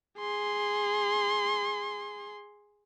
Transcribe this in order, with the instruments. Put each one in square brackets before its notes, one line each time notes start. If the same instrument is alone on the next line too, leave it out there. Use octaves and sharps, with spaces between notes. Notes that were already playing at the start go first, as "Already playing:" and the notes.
[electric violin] G#4 C6